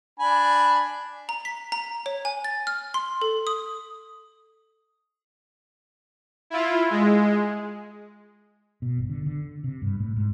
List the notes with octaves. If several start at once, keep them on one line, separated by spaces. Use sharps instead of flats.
D4 G#5 B5
A#5
B6
A#5
C#5
G#5
A6
F6
C6
A4
D#6
E4 F4
G#3
B2
G1
D3
D3
C3
G2
A2
G#2